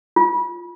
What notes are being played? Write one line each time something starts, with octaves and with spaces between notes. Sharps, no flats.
F4